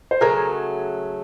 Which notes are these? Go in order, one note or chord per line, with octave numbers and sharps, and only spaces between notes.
C5
C#3 F#3 A3 A#4